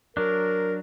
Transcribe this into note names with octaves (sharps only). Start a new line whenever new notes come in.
F#3 D4 A#4